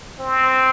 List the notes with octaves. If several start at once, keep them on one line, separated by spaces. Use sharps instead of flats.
C4